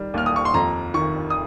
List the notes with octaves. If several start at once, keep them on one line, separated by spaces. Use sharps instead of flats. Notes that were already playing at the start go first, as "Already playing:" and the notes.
Already playing: D#3 G3
D#2 F6
D#6
C#6
C6
F2 A#5
D#3 C#6
D#6